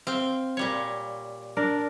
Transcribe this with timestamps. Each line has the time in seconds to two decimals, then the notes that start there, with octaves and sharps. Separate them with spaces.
0.07 C4 F5 G5
0.57 A#2 G3 C#5
1.57 D4 A#4